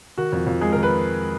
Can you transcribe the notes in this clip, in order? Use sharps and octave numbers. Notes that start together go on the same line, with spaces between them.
D#3 F#4
F2
F2
G#3 G#4
A#4
D#3
B4